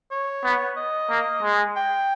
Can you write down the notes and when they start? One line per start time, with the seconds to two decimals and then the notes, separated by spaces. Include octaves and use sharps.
0.11 C#5
0.44 B3
0.77 D#5
1.10 A#3
1.42 G#3
1.76 G5